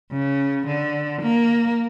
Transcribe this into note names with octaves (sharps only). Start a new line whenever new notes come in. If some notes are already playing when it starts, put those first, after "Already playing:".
C#3
D3
A#3